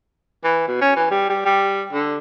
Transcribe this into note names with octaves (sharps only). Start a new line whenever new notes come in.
E3
B2
C#4
E3
G3
G3
G3
D3